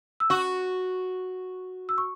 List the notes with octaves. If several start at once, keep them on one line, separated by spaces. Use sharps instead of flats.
E6
F#4 C#6
E6
C#6